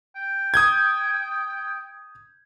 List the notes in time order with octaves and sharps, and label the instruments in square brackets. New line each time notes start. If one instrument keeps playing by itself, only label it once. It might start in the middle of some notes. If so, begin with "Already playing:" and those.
[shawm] G5
[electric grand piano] D#6 G6 G#6